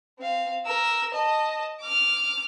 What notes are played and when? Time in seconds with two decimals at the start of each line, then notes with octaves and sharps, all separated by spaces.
0.19 C4 F5
0.66 A#4 E6
1.14 D#5 A5
1.80 D6 F6